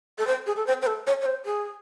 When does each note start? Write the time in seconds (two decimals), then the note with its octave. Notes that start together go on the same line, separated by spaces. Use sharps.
0.18 A4
0.27 C5
0.46 G#4
0.56 A4
0.67 C5
0.82 C5
0.87 A4
1.07 C#5
1.21 C#5
1.26 C5
1.46 G#4